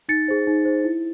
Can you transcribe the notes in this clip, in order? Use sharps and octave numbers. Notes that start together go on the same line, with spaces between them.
D#4 A6 C#7
G#4 C5
D#4
G#4 C5
E4